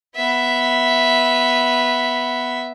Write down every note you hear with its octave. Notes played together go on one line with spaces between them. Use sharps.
B3 E5